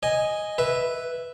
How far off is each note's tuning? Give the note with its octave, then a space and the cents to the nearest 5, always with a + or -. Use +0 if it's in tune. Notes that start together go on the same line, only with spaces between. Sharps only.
D#5 +0 G#5 -5
B4 +0 E5 +0